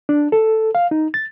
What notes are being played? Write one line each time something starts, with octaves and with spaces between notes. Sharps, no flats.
D4
A4
F5
D#4
A6